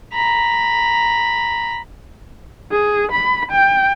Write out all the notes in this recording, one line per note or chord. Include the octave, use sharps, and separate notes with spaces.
A#5 B5
G#4
B5
G5